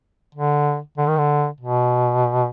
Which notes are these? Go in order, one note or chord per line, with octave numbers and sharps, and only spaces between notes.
D3
D3
D#3
D3
B2